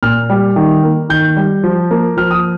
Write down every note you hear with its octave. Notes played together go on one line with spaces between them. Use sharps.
A#2 F6
G3
D#3
A#3
D#3 G6
G3
F3
A#3
F3 F6
D#6